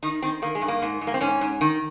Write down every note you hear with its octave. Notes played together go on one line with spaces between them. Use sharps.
D#3 D#4
D#3 C4
D#3 A#3
G#3
G2
A#3
G#2
G#2
A#3
C4
G#2 C#4
G#2
D#3